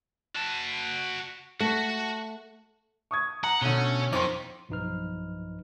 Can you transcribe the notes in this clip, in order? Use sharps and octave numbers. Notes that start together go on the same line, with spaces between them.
F#4 A5
A3 F#4
C#6 D#6 G#6
F#5 A#5
B2 D3 A3 C#4 G7
F2 D#3 C6 B6
B1 G2 F3 D#4 B4 F6